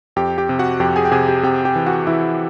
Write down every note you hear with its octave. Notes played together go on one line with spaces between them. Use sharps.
F2 G4 G5
G4 G5
C3
F#4 F#5
F2 G4 G5
G#4 G#5
G5
C3 G#4 G#5
G4 G5
C3 G4 G5
G4 G5
E3
F#4 F#5
E3 E4 E5